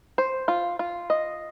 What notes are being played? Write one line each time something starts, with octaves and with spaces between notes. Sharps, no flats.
C5
F4
F4
D#5